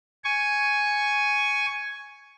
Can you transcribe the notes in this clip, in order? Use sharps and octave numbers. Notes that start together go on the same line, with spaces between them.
G#5 C#6